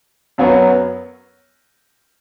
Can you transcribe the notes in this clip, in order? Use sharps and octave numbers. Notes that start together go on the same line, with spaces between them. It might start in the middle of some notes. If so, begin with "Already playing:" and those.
F#2 F#3 B3